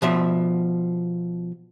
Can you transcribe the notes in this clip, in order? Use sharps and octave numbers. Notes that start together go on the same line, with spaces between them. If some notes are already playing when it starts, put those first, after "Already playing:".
B2 F3 E5